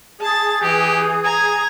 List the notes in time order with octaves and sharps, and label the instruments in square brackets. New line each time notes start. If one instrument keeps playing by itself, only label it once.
[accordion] G#4 [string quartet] A5 A6
[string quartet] E3 [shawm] G4
[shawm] G#5 [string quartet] A#5 G#6